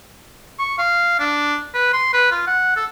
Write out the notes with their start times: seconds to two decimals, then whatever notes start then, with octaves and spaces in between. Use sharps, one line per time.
0.59 C#6
0.78 F5
1.19 D4
1.74 B4
1.93 C6
2.13 B4
2.31 F4
2.47 F#5
2.76 A4